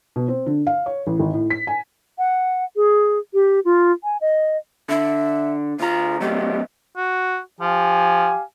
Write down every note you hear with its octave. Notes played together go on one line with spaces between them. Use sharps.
B2
C4
D3
F5
C#5
A1
G#1
A2
B6
G#5
F#5
G#4
G4
F4
G#5
D#5
D3 E5
D2 F4 A#5
F#3 A3 B3 G4
F#4
F3 G4 F5 G#5